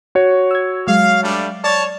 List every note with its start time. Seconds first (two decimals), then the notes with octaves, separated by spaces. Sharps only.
0.15 F#4 C#5
0.51 E6 G#6
0.87 F#3 G#3 F5
1.23 G3 A3 D4
1.64 C#5 D5 A5